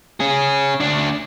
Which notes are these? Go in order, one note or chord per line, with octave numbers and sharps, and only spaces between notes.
C#4 G#4
D2 D4